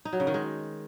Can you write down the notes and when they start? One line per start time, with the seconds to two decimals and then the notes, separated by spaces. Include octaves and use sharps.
0.05 D#4
0.13 F#3
0.20 C#3
0.27 D#3
0.34 G#3